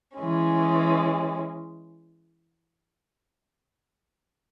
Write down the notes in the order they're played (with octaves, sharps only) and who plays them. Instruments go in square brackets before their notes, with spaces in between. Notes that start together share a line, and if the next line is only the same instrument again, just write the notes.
[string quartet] E3 G#3 C#4